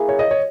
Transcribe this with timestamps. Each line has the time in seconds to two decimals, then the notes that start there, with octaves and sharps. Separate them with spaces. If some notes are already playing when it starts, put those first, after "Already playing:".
Already playing: A#3 E4 G#4
0.09 C#5
0.19 D#5
0.31 C#5